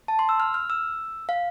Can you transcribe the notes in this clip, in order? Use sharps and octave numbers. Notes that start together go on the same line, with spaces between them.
A5
C6
E6
F6
F6
E6
F5